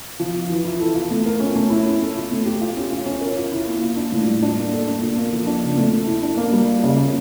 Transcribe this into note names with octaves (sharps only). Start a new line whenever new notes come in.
F3
F4
E3
E4
A4
F4
A3
A#4
C#4
A3
E4
C#4
A4
F4
A3
G4
F4
C#4
F4
C#4
A#4
F4
E4
A#3
F4
D4
A2
G3
D4
A#3
A4
D4
A#2
A#3
F3
D4
C#3
A3
A4
E4
D4
A#3
G3
F4
C#3
A#3